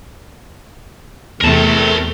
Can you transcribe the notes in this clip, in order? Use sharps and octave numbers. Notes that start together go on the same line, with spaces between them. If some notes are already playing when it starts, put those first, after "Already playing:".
E2 C3 A3 A#4 A5